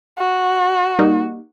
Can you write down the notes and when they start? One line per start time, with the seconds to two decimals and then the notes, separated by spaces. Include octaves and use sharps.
0.18 F#4
0.99 G3 A#3 D#4